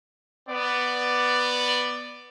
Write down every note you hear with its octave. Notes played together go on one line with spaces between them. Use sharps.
B3 D5